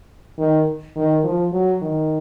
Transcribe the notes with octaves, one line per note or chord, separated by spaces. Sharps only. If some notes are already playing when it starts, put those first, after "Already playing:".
D#3
D#3
F3
F#3
D#3